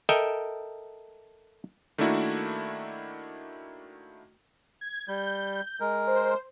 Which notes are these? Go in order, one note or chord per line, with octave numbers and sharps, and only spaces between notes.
A4 A#4 D#5 E5 G5
D#3 A3 A#3 D4 E4 F#4
G#6
G3 G6
G#3 A#4
C5